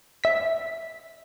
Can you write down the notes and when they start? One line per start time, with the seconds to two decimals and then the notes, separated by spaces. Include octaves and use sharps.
0.24 E5 B6